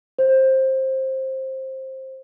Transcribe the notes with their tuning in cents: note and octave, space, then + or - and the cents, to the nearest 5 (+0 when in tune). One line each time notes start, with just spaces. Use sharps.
C5 +15